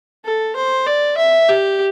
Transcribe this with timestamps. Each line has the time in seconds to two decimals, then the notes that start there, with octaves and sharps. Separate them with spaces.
0.25 A4
0.56 C5
0.86 D5
1.17 E5
1.49 G4